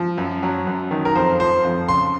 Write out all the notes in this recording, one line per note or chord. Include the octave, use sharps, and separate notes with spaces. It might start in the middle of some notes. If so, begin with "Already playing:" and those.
Already playing: F3
F#2
F#3
F#2
D#3
A#4
F2 C5
F3 C5
F2
C#3 C6